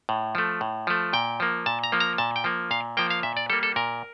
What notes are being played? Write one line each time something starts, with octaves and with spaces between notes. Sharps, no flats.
A2
F3 A3
A2
F3 A3
A#2 G5
F3 A#3
A#2 A5
A#5
F3 A#3
A#5
A#2 A5
G5
F3 A#3
A#2 F5
F3 A#3 G5
F5
A#2 E5
D5
G3 A#3 A4
A4
A#2 A#4